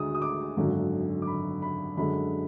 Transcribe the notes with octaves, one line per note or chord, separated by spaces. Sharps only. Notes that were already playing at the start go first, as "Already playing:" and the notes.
Already playing: D2 D3 G#3 D#6
D#6
D6
G#1 F#2 D3 F#3
D6
B5
B5
F#2 D3 G#3 B5